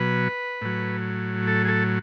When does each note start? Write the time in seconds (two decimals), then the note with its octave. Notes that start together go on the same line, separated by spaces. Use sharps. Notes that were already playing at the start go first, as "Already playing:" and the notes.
Already playing: B2 F#3 B4
0.62 A2 F#3
1.47 A4
1.65 G#4
1.68 A4